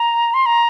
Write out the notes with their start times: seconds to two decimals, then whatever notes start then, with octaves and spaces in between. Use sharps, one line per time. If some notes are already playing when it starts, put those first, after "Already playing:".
Already playing: A#5
0.34 C6
0.46 A#5